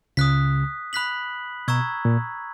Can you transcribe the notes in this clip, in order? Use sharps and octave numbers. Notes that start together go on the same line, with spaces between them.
C#2 C#3 D#6 F#6 B6
B5 F#6 B6 F#7
B2 A#5 C#6 E6 G#6
A#2